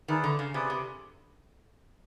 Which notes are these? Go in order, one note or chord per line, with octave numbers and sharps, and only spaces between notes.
D#3 E4 G#4 B4 D5
D3
C#3
C3 E4 G#4 B4 D5
C3